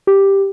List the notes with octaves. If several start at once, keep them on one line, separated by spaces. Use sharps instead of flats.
G4